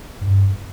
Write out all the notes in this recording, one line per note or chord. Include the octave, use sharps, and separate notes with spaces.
G2